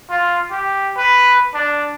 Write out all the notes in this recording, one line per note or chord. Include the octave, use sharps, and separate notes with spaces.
F4
G4
B4
D4